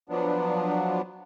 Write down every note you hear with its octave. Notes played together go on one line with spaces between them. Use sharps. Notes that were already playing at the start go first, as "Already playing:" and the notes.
F3 F#3 B3 D4